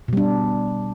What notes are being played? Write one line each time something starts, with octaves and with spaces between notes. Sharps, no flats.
B2 G3 D4